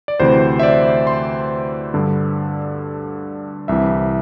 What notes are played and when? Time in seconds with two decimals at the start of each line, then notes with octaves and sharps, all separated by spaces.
0.08 D5
0.20 D2 C3 E3 C5
0.59 E5
0.63 D5
1.07 C6
1.94 G2 D3
3.68 C2 C3 E3 E5